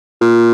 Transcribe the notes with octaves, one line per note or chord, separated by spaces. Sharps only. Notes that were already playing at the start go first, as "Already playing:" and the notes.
A#2